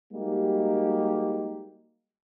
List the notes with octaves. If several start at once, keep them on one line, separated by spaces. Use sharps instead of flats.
G3 G#3 A#3 D#4 F#4 G4